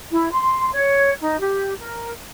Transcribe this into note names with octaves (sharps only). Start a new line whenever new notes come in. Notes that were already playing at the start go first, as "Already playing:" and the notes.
E4
C6
C#5
D#4
G4
A#4